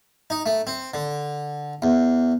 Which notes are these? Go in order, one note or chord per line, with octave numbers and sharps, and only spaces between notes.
D#4
A3
C4
D3
E2